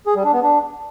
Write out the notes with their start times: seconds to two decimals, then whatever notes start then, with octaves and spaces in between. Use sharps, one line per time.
0.07 G#4
0.16 G3
0.25 D4
0.34 B3
0.43 D4